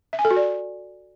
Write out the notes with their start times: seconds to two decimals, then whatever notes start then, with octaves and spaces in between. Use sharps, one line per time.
0.13 E5
0.19 G#5
0.25 A4
0.31 F#4
0.36 D5